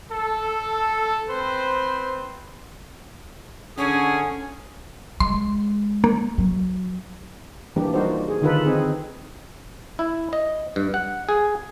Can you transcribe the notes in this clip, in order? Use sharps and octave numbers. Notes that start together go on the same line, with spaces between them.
A4
C4 B4 C5
D3 C#4 G#4
G#3 C6
A#3
F#3
E3 G3 A#3 D4 G4
G3 D#4 F4 F#4 A#4 C5
G#4
D3 D#3 D#4 F4 A4 B4
C4 D#4 G#4
E4
D#5
G2
F#5
G#4